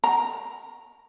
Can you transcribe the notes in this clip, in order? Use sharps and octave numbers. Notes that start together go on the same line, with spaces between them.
A#5